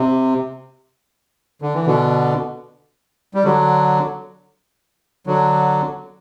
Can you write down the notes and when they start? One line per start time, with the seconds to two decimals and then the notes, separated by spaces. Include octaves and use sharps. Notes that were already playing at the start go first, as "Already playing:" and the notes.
Already playing: C3
1.62 D3
1.74 E3
1.87 B2 D3
3.34 G3
3.44 D3 F#3
5.27 D3 F#3